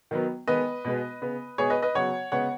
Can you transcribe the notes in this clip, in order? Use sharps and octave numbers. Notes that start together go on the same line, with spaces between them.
D#3 F#3 B3
D#3 G#3 B3 B4 D#5
B2 G#3 B3
C#3 B3
B2 G#3 B3 G#4 C#5
B4 D#5
B4 D#5
C#3 F#3 B3 C#5 F#5
C#3 G#3 B3 C#5 F#5